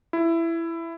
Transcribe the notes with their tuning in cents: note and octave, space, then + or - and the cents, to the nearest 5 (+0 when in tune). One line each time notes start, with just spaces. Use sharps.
E4 +15